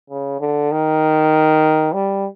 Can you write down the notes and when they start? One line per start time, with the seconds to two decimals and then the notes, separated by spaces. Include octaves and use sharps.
0.10 C#3
0.40 D3
0.72 D#3
1.94 G3